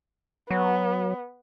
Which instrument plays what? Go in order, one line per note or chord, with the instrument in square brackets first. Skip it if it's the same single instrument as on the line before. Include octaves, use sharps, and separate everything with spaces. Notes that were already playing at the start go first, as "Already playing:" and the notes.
[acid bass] F#3 [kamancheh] B3